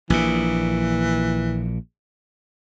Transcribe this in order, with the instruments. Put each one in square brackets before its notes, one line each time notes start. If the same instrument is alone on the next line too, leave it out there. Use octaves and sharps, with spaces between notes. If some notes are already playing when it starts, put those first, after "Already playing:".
[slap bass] A#1 A#2 [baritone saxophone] E3